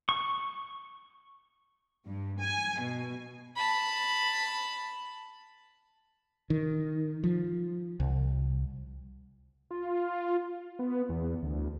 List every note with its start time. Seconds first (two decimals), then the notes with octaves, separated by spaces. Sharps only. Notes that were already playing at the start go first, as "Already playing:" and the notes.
0.09 C#6
2.06 G2
2.40 G#5
2.79 B2
3.56 A5 B5
6.50 D#3
7.24 F3
8.00 C2
9.71 F4
10.79 B3
11.09 E2
11.42 D2